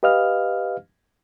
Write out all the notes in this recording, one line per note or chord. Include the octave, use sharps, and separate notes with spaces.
G4 B4 D#5 F5 F6